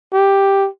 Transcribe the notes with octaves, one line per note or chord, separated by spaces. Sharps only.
G4